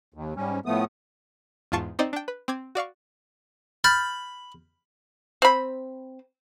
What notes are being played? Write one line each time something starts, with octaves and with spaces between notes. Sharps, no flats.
D#2
G#2 G3 C#4
A2 F3 A3 B3 D#6
E2 G#2 F4 A5 C#6 C7
C4 D#4 C5 D5 D#5
D4 G5
B4
C4 D6 G#6
F#4 D5 F5 C#6
B5 F6 G6 A6
C4 B5